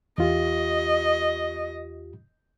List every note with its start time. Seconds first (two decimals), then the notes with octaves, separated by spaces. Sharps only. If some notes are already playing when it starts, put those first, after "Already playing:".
0.18 E2 F4 G4 D#5